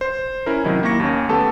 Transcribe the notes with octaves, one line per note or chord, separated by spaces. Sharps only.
C5
C#4 E4 A#4
C3 D#3 F#3 D#4 E4
A#3 E4 C#6 A#6 C#7
D#2 C#4
A3 B3 G4 A4 A5